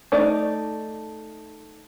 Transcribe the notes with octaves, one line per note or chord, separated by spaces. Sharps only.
A3 D#4 D5